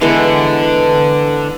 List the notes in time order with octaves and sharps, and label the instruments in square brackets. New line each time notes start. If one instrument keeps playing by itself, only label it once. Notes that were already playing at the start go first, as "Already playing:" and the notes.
[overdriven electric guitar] D3 [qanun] E3 G#3 B3